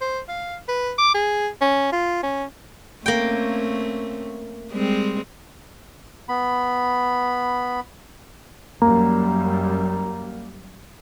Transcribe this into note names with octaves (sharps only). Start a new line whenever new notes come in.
C5
F5
B4
D6
G#4
C#4
F4
C#4
A3 A#3 C4 C#4 G5
G3 G#3 C4
B3 B5
F#2 G3 A#3 A#5